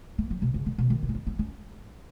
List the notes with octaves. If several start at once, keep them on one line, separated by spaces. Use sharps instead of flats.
A#3
F#3
B2
C#3
D#3
B2
D#3
B3
C#4
B3
B3
C#4